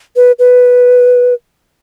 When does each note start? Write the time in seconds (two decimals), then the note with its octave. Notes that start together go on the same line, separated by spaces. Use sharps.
0.16 B4
0.39 B4